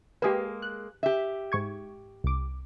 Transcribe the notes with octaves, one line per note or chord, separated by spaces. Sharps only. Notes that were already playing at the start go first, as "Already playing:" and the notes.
G#3 A#3 G4 G#4 B4
F#6
G4 E5
G#2 C#6 G#6
C2 D6